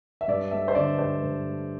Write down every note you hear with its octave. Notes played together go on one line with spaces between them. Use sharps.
E5
G2 D5
A3 E5
C5
D3 D5
G2 C5
G2
A3